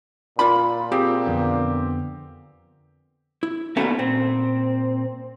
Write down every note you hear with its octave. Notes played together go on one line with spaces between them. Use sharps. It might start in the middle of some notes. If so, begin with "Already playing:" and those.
A#2 F4 D5 B5
C4 F4 G4 G#4
F2 D3 B3
E4
D#2 B2 A3 C#4 A4 F#5
A#2 C4